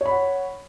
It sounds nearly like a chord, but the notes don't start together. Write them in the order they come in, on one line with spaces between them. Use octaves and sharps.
C#5 B5 F#5